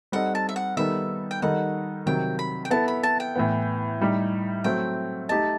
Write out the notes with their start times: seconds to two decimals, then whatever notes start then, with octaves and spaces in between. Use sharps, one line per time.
0.12 G3 C4 D#4 A4 D#5 F#5
0.35 A5
0.49 E5
0.56 F#5
0.77 D#3 G3 B3 D#4 A4 E5
1.31 G5
1.42 D#3 G3 D#4 A4 D#5 F#5
2.06 C3 D#3 F#3 G5
2.39 B5
2.65 G5
2.71 B3 E4 A4 A5
2.88 B5
3.03 A5
3.20 G5
3.35 A2 E3 B3
4.01 A2 G3 D#4 G4
4.64 F#3 A3 C4 G5
5.29 A3 D#4 G4 D#5 A5